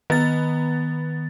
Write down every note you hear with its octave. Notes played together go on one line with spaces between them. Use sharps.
D#3 B3 A6